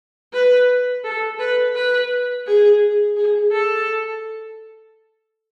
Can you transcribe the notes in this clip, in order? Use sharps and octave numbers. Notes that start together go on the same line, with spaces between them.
B4
A4
B4
B4
G#4
G#4
A4